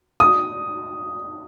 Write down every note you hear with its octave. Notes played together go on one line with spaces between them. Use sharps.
D#6